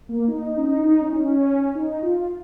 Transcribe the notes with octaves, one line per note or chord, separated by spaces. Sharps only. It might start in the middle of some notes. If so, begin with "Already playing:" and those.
A#3
D#4
D#4
C#4
D#4
D#4
C#4
D#4
C#4
D#4
F4